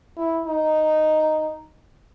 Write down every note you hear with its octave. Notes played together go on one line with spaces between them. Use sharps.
E4
D#4